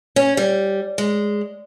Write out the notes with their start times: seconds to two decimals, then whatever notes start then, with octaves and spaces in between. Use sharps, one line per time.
0.16 C#4
0.37 G3
0.98 G#3